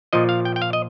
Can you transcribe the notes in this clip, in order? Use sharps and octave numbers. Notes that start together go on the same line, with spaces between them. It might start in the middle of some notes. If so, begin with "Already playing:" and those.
A#2 F3 D#5
F5
G5
G5
F5
D#5